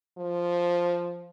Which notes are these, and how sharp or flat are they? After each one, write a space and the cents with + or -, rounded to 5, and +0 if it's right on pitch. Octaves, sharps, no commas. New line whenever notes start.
F3 +0